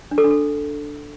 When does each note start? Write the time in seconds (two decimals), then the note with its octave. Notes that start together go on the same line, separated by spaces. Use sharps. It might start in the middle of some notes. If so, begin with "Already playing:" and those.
0.11 D4
0.18 A4
0.24 D4
0.31 A4